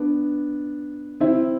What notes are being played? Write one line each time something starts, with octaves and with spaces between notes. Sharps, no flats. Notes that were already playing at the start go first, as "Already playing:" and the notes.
Already playing: B3 D4
C4 E4